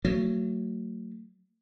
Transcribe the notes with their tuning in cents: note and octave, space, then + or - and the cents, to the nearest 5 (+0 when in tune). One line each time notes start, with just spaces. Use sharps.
F#3 +0 A3 +40